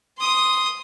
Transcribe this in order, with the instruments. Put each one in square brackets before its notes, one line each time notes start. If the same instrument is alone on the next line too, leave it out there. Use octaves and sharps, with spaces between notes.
[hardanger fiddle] C6 D#6